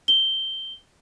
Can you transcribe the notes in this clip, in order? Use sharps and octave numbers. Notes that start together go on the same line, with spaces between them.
G7